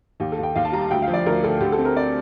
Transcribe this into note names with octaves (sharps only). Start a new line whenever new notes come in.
D#2 G4
A4
D#2
G5
D#2 F5
A5
G3 A#5
A5
D2 G5
F5
F3
D5
D2 A#4
D2 A4
D3 G4
A4
C4
A#4
C4 D5